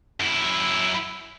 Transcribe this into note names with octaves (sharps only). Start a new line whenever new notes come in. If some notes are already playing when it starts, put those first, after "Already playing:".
F#2 E4